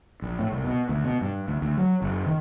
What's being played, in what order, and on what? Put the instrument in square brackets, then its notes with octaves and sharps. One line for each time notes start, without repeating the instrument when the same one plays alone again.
[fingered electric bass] A#1
A2
C2
B2
D2
B2
G2
D2
D2
F#3
F#1
D#3